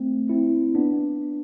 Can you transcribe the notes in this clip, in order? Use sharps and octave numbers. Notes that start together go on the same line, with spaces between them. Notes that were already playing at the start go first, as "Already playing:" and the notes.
Already playing: A3 C4
C4 E4
B3 D4